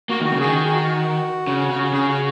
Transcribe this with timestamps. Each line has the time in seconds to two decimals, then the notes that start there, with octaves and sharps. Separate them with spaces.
0.10 A#3 F#4
0.21 D#3
0.25 F#4
0.33 C#3
0.40 D#3 G#4
0.55 F#4
0.65 G#4
0.75 F#4
1.47 C#3
1.71 C#3
1.83 F#4
1.93 C#3 G#4
2.09 F#4